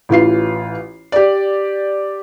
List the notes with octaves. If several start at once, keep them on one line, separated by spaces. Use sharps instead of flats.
A1 E3 F4 C7
G4 D5